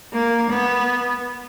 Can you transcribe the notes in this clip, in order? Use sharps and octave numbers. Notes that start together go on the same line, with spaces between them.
A#3
B3